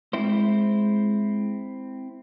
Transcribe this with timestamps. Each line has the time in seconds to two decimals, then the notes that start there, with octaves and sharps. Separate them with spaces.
0.13 G#3 C4 E4 C5